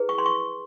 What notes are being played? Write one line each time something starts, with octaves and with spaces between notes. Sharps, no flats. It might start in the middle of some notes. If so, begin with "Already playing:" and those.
Already playing: E4 G#4 B4
C#6
C6
C#6